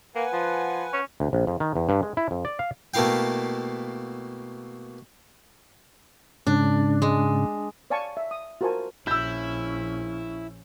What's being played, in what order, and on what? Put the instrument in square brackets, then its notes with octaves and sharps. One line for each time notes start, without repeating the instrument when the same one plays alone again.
[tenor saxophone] A#3 [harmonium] B4 F#5 G#5
[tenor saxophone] F3
C#4
[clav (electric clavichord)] D2
A#1
F2
D#3
E2
G2
G#3
E4
F2
D5
F5
[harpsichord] B2 A3 A#3 E4 F5 G5
[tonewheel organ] G#2 C#3 [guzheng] D4
[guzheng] G#3
[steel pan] C#5 D5 F5 G#5 A5 C#6
E5
D#6
F4 F#4 A#4 C5 G#5 A5
[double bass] A#1 C#4 [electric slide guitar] E4 [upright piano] E6 G6